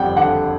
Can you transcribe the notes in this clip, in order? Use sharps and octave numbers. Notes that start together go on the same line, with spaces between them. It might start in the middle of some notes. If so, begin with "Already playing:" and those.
Already playing: F#1 F2 G3 F#5 G5
D3 F#5